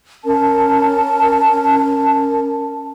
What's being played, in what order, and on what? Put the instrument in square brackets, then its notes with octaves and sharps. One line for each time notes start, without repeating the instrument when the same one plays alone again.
[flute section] C#4 A#4 A5